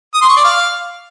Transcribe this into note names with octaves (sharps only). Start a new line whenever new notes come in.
D#6
C6
C#6
D5
F5